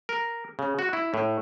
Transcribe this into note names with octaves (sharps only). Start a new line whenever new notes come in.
A#4
C#3
F#4
E4
A2